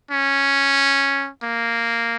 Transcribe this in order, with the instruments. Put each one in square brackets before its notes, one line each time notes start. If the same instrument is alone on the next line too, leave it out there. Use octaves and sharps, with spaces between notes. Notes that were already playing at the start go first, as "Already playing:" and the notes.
[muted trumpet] C#4
A#3